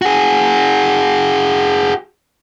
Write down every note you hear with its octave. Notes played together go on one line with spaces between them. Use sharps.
F#4 G#4